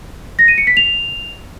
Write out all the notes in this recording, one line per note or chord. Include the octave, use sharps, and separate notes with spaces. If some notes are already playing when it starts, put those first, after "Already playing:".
A#6
D#7
C#7
B6
F7